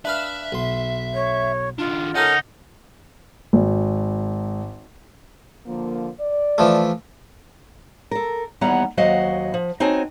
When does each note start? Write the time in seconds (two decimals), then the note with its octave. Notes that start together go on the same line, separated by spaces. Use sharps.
0.05 D4 B4 E5 F5
0.52 B1 C6
1.14 C#5
1.79 D#3 D4 F4
2.15 C#3 C#4 D#4 A4 A#4 F#5
3.53 G#1
5.66 D3 F3 A#3
6.20 D5
6.58 E3 F3 A3
8.11 A4 A#4
8.61 D#2 E3 G3 B3 F#5 A#5
8.97 D#2 F#3 F#4 C5 D#5 F5
9.54 F3
9.80 C4 D#4 F#4 C#5 G#5 A5